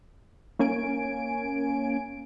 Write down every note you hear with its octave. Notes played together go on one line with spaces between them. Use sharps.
A#3 C#4 G#5 D7